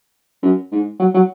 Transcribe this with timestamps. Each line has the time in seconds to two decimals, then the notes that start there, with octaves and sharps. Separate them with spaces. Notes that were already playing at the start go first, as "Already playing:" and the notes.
0.43 F#2
0.71 G#2
0.99 F#3
1.14 F#3